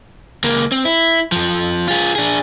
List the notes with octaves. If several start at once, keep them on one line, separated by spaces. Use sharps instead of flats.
C#2 A#3
C4
E4
F2 F3
F4 G#4
D4 G#4